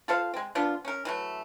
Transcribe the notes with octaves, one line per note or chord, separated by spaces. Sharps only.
F4 A4 C5 F5
G#3 C4
F3 B3 D4 F4
C#4 A#4
E3 F#3 A3